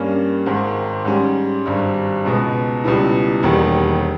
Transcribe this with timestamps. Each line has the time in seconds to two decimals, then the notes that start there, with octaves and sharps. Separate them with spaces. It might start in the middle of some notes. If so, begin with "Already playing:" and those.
Already playing: G2 G3 A#3 C#4
0.46 G#1 G#2 D#3
1.05 G#2 G3 C#4
1.65 G#1 G2 G3
2.25 C#2 B2 G#3 B3
2.84 C#2 B2 G3 B3 E4
3.43 E1 D#2 D#3 G3